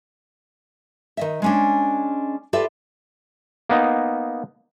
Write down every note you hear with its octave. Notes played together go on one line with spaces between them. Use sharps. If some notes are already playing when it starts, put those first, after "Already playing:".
D#3 D#5 E5
G#3 C#4 D4
F4 G4 A4 B4 D5 E5
A#3 B3 D#4